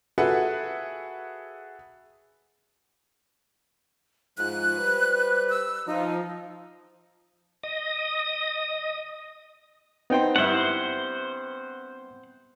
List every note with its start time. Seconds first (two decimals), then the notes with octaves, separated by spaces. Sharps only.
0.18 F#4 G#4 A4 B4 E5 F#5
4.38 G#2 F3 F4 F#6
4.79 G3 B4 C5
5.50 E6
5.87 F3 D#4
7.63 D#5 D#6
10.10 B3 C4 D#4 C5 G5
10.36 G2 E4 C5 F#5